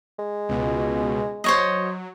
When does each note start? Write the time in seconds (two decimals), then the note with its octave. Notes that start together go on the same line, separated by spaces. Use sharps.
0.18 G#3
0.49 C#2 B2
1.44 F#3 C5 C#5 D#5